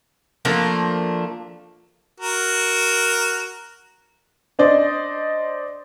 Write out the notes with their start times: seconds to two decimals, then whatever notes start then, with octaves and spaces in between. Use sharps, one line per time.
0.45 F3 A3 A#3 D4
2.20 F#4 A#4
4.59 D4 C5 D5 D#5